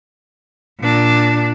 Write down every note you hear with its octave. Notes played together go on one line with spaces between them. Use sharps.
A#2 D4